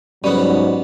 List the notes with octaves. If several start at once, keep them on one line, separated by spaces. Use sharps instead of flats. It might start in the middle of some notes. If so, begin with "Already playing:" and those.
G#2 F#3 G3 B3 C#4